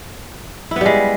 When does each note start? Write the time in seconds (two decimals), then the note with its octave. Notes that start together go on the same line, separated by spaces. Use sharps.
0.71 E4
0.76 B3
0.81 G3
0.86 G#3